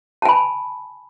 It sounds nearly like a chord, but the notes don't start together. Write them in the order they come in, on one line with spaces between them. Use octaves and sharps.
A5 G#5 B5